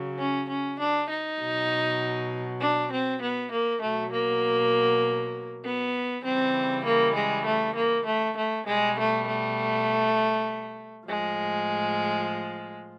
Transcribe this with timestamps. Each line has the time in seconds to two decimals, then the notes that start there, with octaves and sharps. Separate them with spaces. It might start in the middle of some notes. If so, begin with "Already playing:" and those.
Already playing: C#3 F#3
0.18 C#4
0.49 C#4
0.79 D4
1.09 D#4
1.39 B2 F#3
2.60 D4
2.90 C4
3.21 B3
3.51 A#3
3.81 B2 F#3 A3
4.12 A#3
5.64 B3
6.24 C#3 E3 G3 C4
6.85 A#3
7.15 G#3
7.44 A3
7.75 A#3
8.06 A3
8.36 A3
8.66 B2 G3 G#3
8.97 A3
9.27 A3
11.08 A2 F3 G#3